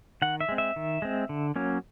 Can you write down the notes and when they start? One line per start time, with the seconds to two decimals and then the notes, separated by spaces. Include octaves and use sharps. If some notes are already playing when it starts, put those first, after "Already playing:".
0.22 D#3 F#5
0.41 E5
0.49 G#3 C4
0.58 E5
0.76 D#3
1.02 G#3 C4
1.29 D3
1.56 F#3 A#3 C#4